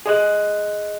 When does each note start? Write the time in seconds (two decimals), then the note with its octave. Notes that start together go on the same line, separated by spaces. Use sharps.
0.06 G#4 D#5 F#6